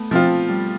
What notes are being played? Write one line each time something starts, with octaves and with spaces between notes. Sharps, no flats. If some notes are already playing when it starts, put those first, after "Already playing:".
Already playing: A3 B3
F3 C4 F4
G3